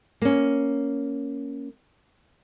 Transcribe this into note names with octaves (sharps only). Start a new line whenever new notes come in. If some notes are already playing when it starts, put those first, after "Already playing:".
A#3 C#4